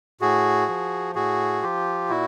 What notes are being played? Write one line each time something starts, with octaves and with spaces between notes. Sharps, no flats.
A2 F#4 G#4
F3
A2 F#4 G#4
F3 F4 G4
A#2 E4 F#4